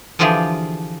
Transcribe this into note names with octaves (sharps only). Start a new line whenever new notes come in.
D3 E3 F3 F4 G4 G#4